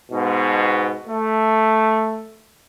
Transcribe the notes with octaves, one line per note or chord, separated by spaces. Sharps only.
G#2 B2
A3